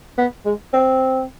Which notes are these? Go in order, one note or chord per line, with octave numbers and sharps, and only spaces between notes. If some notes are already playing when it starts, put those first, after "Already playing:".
B3
G#3
C4